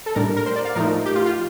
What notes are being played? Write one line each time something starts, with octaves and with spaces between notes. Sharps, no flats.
A4
A2 G3 D4 A#4
A#4
C5
D5
F5
A2 F3 A3 D#4 A#4
G4
F4
F4